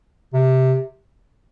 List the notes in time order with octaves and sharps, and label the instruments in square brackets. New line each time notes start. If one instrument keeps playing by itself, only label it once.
[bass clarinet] C3